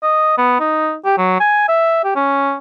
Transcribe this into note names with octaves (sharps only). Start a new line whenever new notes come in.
D#5
B3
D#4
G4
F#3
G#5
E5
G4
C#4